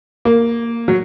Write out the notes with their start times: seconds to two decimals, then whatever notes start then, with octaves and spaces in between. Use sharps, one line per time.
0.25 A#3
0.88 F#3